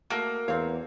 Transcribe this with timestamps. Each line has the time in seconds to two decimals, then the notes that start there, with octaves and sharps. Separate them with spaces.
0.10 A3 A#3 F#4
0.48 E2 C4 C#5 F5